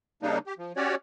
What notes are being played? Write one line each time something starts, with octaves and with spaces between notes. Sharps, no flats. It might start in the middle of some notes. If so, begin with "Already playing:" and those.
C#3 G3 A#3 D4 D#4
G4
F3
C#4 F#4 G4 C#5 D5